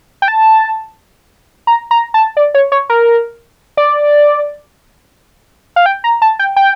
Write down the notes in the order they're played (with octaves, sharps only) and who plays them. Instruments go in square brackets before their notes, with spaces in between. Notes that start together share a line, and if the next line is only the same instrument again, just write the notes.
[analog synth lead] G5
A5
A#5
A#5
A5
D5
C#5
C#5
A#4
D5
F5
G5
A#5
A5
G5
G5